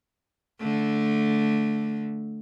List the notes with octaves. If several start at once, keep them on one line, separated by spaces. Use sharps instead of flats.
D3 A3